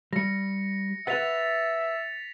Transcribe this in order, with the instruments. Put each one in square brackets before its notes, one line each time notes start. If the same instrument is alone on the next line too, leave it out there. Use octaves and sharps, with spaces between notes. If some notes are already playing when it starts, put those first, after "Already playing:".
[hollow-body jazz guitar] G3 [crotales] A#6 C#7
[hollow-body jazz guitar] B4 F#5 [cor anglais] E5 [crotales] A6 B6 F7